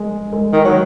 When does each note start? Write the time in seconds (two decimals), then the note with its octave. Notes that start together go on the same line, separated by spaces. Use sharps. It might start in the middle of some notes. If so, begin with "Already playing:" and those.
Already playing: G#3
0.33 G#3
0.53 D#3
0.65 F#3